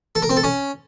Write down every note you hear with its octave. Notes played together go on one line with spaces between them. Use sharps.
A4
A#4
C4
A4
C#4